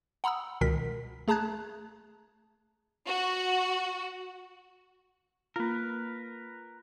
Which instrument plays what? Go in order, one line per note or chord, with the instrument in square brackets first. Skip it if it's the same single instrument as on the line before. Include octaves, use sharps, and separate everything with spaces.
[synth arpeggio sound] F#5 A#5 B5 D#6 E6
C#2 B2 D#3 A#4 B6
A3 G#4 A5 A#5 F#6 G#6
[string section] F#4
[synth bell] A#3 F4 [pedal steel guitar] A#4 B4